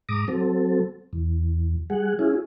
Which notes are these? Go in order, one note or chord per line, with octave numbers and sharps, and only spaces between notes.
G#2 A#5 D6 D#6
F#3 C4 A4
E2
G3 G#4 F#5
C#4 E4 F4 G#4